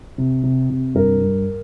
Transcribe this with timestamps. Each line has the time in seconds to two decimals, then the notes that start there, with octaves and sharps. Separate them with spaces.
0.18 C3
0.43 C3
0.70 C3
0.95 G2 A#4
1.21 G2